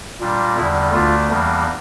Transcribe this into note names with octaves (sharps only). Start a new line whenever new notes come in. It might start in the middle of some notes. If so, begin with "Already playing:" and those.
A#2 G3 D4
E2 D3 G3 E4
D2 D3 A3 D4 F4
E2 E3 G3 A#3 D4